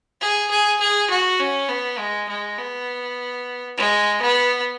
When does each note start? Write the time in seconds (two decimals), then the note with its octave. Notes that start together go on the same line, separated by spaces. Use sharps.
0.21 G#4
0.51 G#4
0.80 G#4
1.10 F#4
1.40 C#4
1.69 B3
1.98 G#3
2.29 G#3
2.58 B3
3.77 G#3
4.22 B3